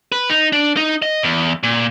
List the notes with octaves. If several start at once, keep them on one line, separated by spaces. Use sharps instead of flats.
B4
D#4
D4
D#4
D#5
E2
A#2